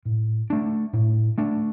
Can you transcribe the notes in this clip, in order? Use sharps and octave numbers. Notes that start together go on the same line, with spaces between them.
A2
A3 D4
A2
A3 D4